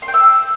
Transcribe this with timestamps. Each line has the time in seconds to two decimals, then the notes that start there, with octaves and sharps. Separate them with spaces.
0.02 C6
0.08 G5
0.14 E6